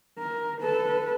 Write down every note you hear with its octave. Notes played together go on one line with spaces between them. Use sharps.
A#4
A4 B4